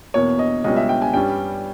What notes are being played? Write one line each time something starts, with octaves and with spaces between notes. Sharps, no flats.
E2 B2 A#3 C#5
D#5
C#2 B2 G3 C#4 D#5
E5
G5
G#5
G2 G3 C#4 G5